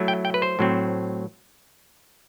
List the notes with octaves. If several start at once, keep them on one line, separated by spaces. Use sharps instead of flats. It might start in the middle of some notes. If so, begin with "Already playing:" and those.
Already playing: F#3 A3 E4
G5
G5
B4
C5
A2 F#3 C4